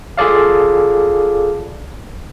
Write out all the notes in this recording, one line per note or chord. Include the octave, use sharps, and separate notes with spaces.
F4 G#4 A4 D5 F5